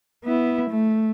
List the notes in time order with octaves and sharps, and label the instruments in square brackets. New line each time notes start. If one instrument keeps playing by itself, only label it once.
[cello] B3 E4
A3